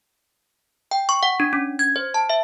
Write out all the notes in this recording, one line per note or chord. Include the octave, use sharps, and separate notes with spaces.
G5
C#6
F#5
D4
C#4
G#6
C5
A5
E5